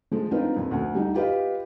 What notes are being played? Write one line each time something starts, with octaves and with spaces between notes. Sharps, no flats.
F3 G#3 A3
C4 D4 D#4 F4 A#4 B4
F2
D2 A3
G3 D#4
F4 G4 B4 D#5 F5